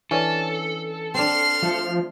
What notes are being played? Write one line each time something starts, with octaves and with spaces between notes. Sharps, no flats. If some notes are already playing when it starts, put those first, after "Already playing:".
E3 C#4 D4 A4
C4 D4 C6 F6
F3 A3